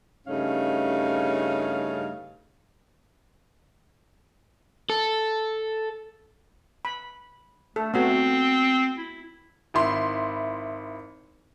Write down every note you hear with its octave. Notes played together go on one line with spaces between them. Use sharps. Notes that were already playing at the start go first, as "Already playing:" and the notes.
G2 C#3 A3 C#4 D#4 F5
A4
B5
A3 A4
A3 B3 C4 F#4
E4
G#1 E4 C6